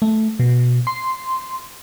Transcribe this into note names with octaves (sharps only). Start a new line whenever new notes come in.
A3
B2
C6